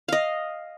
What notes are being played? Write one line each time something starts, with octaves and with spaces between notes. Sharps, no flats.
D#5 F5